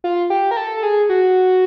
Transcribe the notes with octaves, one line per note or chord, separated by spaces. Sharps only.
F4
G4
A#4
A4
A4
G#4
F#4